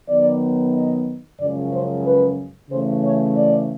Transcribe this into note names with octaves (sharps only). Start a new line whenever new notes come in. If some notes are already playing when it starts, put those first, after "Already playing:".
D#3 F#3 B3 D#4 D5
D#5
F#2 C#3 F3 G#3 C#4 D5
C5
B4
C#3 E3 A3 C5
C#5
D5